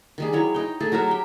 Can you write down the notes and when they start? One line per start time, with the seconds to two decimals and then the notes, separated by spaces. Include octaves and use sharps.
0.18 D#3 G3 G#4
0.33 F#3 E4 C#5
0.54 D#4 G5
0.80 A3 G#4 A4
0.92 F#3 F#4 A#4 E5
1.08 G4 G5